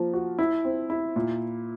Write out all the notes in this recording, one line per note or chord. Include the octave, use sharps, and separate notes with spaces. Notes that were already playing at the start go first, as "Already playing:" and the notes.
Already playing: F3 A#3
F#4
E4
C4
E4
A#2